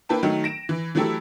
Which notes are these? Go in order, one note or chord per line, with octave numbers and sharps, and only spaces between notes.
A#3 E4 B4 G5 A5
D#3 F#3 A3
A#6 D7 E7
E3
E3 F#3 A3 E4 G4 A4